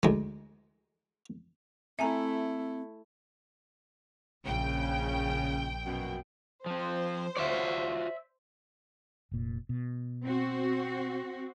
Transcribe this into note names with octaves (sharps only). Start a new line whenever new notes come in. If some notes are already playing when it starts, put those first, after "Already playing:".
D2 G#3
A3 C4 E4 E5 G#5 A#5
A#1 C#3 G5
F#2 B2
F3 C4 C5
F4 F#4 C#5 D5 E5
F1 A#2
B2
C4 F#4